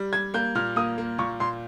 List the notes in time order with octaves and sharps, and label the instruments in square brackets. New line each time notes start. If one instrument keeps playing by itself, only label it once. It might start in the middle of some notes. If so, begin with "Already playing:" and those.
Already playing: [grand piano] G3
[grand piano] G3 [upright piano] G#6
[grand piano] A#3 [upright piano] G6
[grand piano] A#2 [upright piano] F6
[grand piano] A#3 [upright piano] D#6
[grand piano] A#3
[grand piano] A#2 [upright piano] C#6
[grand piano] A#2 [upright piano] C6